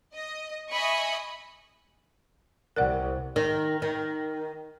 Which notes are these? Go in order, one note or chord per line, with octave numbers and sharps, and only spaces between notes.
D#5
D#5 E5 G#5 B5 C#6 D#6
C2 C3 A#4 D5 F#5
D#3
D#3